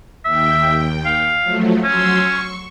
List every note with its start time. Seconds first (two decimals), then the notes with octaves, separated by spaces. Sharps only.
0.25 D#2 E5 G5
1.06 F5
1.43 F3 F#3 A3
1.84 F#3 C#4 C6 E6
2.16 C#6